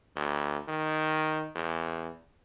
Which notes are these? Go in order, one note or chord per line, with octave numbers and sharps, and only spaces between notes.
D2
D#3
E2